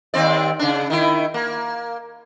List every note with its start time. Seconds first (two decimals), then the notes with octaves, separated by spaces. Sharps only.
0.14 D#2 C4 D5
0.59 C#3 D4
0.90 D#3 E4
1.34 A#3